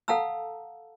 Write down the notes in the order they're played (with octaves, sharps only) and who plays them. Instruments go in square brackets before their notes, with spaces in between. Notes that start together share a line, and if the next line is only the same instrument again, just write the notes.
[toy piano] A4 F5 F#5 A5 A#5 E6